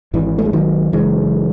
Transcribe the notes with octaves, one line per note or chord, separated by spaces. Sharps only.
G#1 G#2 E3
A3
G#3
D#3 F#3
F#1 F#2 C#3 E3 G#3